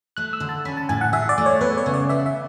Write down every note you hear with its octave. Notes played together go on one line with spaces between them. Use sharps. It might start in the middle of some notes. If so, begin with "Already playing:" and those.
A3 F#6
E6
D3
A5
C#4 B5
A5
A2 G#5
F#5
G#4 E5
D5
A3
C#5
B3 B4
C#5
C#3
D5
B3 E5
E5